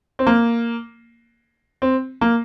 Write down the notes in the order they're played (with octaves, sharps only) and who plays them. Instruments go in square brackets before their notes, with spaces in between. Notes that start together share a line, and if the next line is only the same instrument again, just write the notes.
[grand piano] C4
A#3
C4
A#3